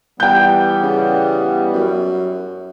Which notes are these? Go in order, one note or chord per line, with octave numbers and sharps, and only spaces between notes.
E3 G3 B3 G5 G6
C#3
F#2